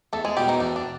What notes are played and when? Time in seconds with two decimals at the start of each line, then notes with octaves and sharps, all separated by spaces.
0.13 E2 A3 A4
0.24 G#3 G#4
0.37 B2 G3 G4
0.48 D#3 D#4
0.60 E2 D4
0.76 D4